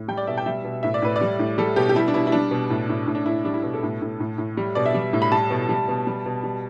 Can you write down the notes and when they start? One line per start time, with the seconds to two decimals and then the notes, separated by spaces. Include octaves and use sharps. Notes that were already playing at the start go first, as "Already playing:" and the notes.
Already playing: A2
0.08 G3 G5
0.17 D5
0.27 B2 E5
0.37 G5
0.46 G3 E5
0.64 B2
0.83 A2 E5
0.94 D5
1.02 A2 B4
1.16 D5
1.21 G3
1.39 A2
1.58 G3 A4
1.76 B2 G4
1.89 G4
1.95 G3 E4
2.08 D4
2.14 B2 E4
2.27 E4
2.32 G3 D4
2.51 B2
2.70 A2
2.89 A2
3.07 A2
3.15 D4
3.26 A2 E4
3.45 G3 D4
3.54 E4
3.63 B2
3.74 A4
3.83 A2
4.02 A2
4.20 A2
4.38 A2
4.57 G3
4.75 B2 D5
4.86 E5
4.94 G3
5.13 A2
5.22 B5
5.32 G3 A5
5.50 B2
5.69 G3
5.88 B2
6.07 G3
6.26 B2
6.44 G3